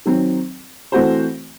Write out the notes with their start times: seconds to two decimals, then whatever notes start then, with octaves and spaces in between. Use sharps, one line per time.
0.06 D#3 F#3 C4
0.92 E3 A3 C4 F#4 C5